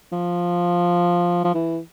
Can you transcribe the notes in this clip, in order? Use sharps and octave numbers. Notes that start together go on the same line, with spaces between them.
F3
F3
E3